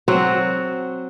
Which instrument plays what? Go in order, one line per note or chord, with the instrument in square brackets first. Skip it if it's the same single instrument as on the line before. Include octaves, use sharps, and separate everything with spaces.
[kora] F#3 C4 F#4